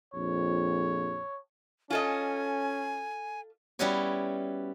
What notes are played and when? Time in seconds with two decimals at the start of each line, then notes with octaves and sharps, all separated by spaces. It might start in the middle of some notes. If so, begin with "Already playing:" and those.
0.14 A#1 F2 C#5
1.90 C#4 F4 A4 D#5 G#5
3.79 G3 B3 C#4 E4 F#4 C#5